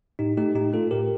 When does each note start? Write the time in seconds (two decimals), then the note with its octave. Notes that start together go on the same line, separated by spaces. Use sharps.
0.19 A2 D#4 G4
0.37 A3 D#4 G4
0.55 A2 D#4 G4
0.73 A3 F4 A4
0.91 A2 G4 A#4